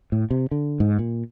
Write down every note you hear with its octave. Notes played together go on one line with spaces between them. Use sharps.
A2
C3
D3
G#2
A#2